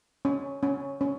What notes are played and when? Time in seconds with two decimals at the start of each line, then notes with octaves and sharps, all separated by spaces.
0.25 C#4
0.63 C#4
1.01 C#4